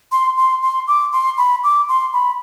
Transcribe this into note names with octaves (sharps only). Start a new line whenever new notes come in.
C6
C6
C6
D6
C6
B5
D6
C6
B5